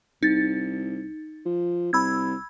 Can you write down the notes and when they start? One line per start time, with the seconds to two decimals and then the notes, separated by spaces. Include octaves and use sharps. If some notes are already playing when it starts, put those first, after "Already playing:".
0.23 C2 D#4 A6
1.45 F3
1.93 C2 B5 E6 G#6